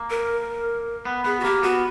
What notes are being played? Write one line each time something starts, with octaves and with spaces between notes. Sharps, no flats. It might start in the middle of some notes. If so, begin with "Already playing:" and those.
Already playing: A#3
A#4
B3
B3 G#4
F#4
A#3 G4
B3 F#4